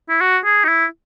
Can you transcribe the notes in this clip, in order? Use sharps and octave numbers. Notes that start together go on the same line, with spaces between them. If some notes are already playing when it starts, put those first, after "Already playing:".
E4
F#4
G#4
D#4
E4